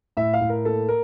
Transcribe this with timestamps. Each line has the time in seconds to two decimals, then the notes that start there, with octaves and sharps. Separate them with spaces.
0.17 A2 E5
0.33 F5
0.41 A2
0.49 A#4
0.65 A#3 A4
0.89 A#4